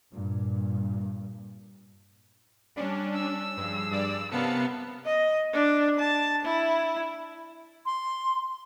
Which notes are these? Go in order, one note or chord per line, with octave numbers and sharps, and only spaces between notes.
G2 A#2
G3 C#4 D4
E6
G2 F3 G#4
G2 D5
C3 B3 C#4 A#4 F5 A5 C#7
D#5
D4
A5
E4
C6